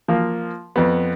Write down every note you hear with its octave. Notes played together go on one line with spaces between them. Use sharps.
F3 A#3 F4
F2 B3